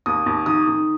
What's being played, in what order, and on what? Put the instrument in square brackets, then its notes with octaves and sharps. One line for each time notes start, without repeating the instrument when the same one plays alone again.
[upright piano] D#2 D#6
D#2
D#3 D#6
D#3